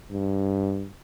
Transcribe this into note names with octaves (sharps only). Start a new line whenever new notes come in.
G2